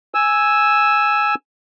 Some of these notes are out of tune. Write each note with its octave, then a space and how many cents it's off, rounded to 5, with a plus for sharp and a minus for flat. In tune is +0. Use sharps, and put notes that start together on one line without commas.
G#5 +0 E6 +0